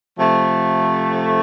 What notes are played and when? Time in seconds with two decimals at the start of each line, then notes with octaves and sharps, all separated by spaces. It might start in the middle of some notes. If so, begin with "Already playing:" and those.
0.18 C3 F3 A3